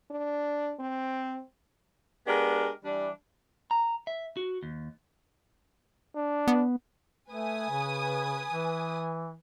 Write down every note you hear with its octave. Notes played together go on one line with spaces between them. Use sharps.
D4
C4
G#3 B3 D4 G4 A#4
E3 G3 D4
A#5
E5
F#4
D#2
D4
B3
A3 B4 G#5 D#6
C#3
E3